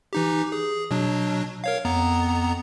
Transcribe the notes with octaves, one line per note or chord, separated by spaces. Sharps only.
E3 D#4 G4
G#4
B2 F#3 D4
A#4 C#5 F5
F2 B3 A#5